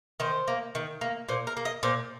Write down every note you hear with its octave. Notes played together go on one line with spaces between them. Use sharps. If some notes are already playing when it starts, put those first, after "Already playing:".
D#3 C5
A#3
D#3
A#3
A#2 C5
A#4
A#3
D#5
A#2 C5